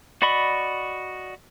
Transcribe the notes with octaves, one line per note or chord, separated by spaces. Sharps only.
F#4 D5 D#5 B5 C#6